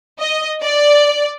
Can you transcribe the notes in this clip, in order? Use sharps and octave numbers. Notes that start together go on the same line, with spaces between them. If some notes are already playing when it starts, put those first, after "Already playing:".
D#5
D5